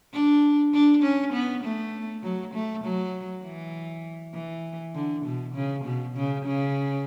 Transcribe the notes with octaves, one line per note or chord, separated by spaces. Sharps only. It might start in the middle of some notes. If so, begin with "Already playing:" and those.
D4
D4
C#4
B3
A3
F#3
A3
F#3
E3
E3
D3
B2
C#3
B2
C#3
C#3